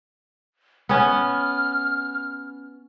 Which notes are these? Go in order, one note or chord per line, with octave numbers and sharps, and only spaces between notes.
B3 C#4 F6